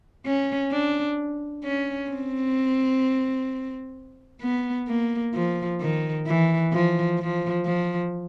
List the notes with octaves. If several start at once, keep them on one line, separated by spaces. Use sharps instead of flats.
C#4
D4
C#4
C4
B3
A#3
F3
D#3
E3
F3
F3
F3